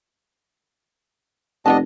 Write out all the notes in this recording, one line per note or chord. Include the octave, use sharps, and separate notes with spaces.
F1 G3 B3 D4 D#5 A5